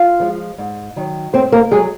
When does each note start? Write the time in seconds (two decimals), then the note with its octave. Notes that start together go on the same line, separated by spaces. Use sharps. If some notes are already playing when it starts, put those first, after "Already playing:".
Already playing: F4 F5
0.20 F3 G#3
0.58 G#2
0.96 D#3 F#3
1.33 G#2 C4 C5
1.52 A#3 A#4
1.71 F#3 G#3 G#4